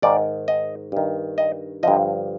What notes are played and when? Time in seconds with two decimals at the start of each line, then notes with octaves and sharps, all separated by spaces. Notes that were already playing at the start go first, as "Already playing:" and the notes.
0.02 G#2 D#3 D5
0.48 D#5
0.92 G2 D#3
1.38 D#5
1.83 G2 D3 F3 D#5